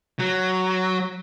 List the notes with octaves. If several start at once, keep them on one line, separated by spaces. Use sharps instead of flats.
F#3